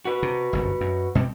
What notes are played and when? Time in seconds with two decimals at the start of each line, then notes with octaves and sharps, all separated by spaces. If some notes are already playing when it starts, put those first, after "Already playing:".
0.05 F#4 B4
0.23 C3
0.53 G1 C2 F#2
0.81 F#2
1.15 B2 G3 C4